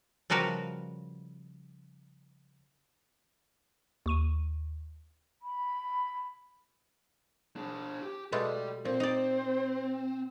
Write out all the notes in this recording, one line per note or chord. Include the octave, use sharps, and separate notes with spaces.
C#3 F3 G3 F#4 A#4 B4
D#2 C#6 D#7
B5
D4 G#4
G4
B2 G#3 A3 G4 D5
A#2 C4 C5
D#4 D5